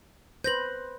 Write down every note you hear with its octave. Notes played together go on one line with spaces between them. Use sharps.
B4 C5 G6 A#6 F#7